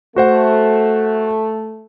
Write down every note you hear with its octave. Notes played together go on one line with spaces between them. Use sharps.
A3 F#4 C5 F#5